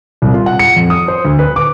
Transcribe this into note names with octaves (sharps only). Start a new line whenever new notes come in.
C2
F4
F#5
C#7
F2
D#6
C5
D2
B4
D6